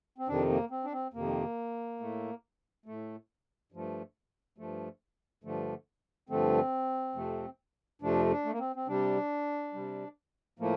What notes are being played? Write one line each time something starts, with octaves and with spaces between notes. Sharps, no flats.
C4
F2 C3 D#3 D4
A#3
C4
D4
C4
F2 C3 D#3 A#3
A2 A3
A2 A3
G2 F3 A3
G2 F3 A3
G2 D3 F3 A3
G2 D3 F3 A3 C4
F2 C3 F3 A3
F2 C3 F3 A3 D4
D4
A3
A#3
C4
C4
C3 G3 D4
C3 G3
A2 F3 A3 A#3